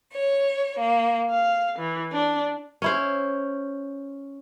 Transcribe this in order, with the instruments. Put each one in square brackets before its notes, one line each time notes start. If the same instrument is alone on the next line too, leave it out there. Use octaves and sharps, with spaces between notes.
[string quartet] C#5
A#3
F5
E3
D4
[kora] C#4 E4 C5